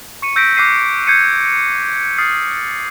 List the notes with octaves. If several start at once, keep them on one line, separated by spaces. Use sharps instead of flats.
C#6 C#7 D#7
E6 G6 A#6 B6 D7
D6 F#6 B6 C7 D#7
G6 G#6 C7 C#7 D#7
D#6 F6 A6 C7